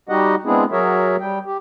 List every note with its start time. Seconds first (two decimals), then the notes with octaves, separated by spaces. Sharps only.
0.09 G3 D#4 F#4 G4 D#5 F#5
0.45 G#3 B3 C4 D4 E4 G#4
0.72 F#3 F#4 G#4 A#4 C#5 E5
1.20 G3 G5
1.46 G4